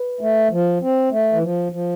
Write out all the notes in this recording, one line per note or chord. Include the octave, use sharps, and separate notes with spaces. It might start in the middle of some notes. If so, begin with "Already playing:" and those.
Already playing: B4
A3
F3
C4
A3
E3
F3
F3